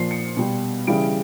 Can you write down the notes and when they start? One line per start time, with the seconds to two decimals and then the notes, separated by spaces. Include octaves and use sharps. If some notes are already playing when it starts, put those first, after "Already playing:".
Already playing: A#2 F3 C7
0.11 C#7
0.37 B2 G3
0.87 C#3 E3 G3 D7